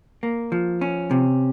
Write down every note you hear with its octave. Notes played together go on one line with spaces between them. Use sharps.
A#3
F3
C#4
C3